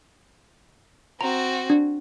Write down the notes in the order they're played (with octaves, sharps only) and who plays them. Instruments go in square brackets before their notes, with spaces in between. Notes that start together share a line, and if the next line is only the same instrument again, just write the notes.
[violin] C4 F#4 [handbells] A#5
[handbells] D4